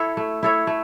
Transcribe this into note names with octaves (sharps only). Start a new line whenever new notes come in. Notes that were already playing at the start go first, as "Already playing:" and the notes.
Already playing: E4 A4 C#5
A3
E4 A4 C#5
A3